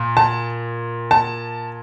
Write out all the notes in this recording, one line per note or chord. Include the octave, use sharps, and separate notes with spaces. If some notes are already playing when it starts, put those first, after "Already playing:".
Already playing: A#2
A5
A5